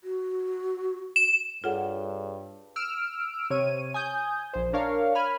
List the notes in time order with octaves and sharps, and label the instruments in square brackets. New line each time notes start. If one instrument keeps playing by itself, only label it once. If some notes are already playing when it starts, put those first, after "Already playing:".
[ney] F#4
[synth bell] E7
[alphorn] G2 [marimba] F4 F#5 [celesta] G#4 A4 C#5
[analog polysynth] E6 F6 D7
C3 C#5 D#7
G#5 D#6 G6
A#1 C5
D4 A#4 C#5 F5
G#5 B5 F6